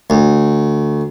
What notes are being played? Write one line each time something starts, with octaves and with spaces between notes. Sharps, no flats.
D2